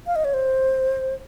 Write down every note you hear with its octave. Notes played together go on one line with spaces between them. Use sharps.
F5
D#5
C#5
C5